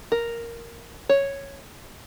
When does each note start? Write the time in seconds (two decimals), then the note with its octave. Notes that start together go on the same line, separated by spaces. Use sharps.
0.12 A#4
1.09 C#5